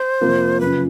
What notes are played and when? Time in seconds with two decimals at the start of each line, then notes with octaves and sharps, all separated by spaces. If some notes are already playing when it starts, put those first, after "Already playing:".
Already playing: C5
0.21 F2 C3 F3 A#3
0.60 F#2 C#3 F3 B4